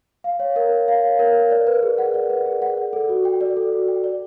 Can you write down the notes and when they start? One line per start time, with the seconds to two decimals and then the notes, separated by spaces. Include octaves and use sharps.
0.24 F5
0.40 C#5
0.56 A#4
0.72 A#4
0.88 F5
1.04 C#5
1.19 A#4
1.35 A#4
1.51 D5
1.67 B4
1.83 G#4
1.98 F#5
2.14 D5
2.30 B4
2.46 G#4
2.62 F#5
2.78 D5
2.93 A4
3.09 F#4
3.25 G5
3.41 D5
3.57 A4
3.73 F#4
3.88 G5
4.04 D5